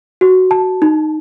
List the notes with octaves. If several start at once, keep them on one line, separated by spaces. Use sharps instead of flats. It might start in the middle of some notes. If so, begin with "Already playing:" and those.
F#4
A5
D#4